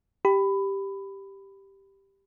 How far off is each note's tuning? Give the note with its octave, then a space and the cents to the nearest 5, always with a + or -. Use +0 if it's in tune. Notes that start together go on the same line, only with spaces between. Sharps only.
G4 +0 B5 +15